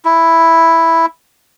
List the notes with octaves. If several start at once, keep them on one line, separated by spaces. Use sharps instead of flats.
E4